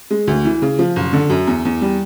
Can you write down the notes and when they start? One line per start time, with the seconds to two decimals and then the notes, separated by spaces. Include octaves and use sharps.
0.11 G#3
0.27 D2
0.45 E3
0.62 C#3
0.79 F3
0.96 F#1
1.13 D3
1.30 F#2
1.47 E2
1.65 E2
1.82 G3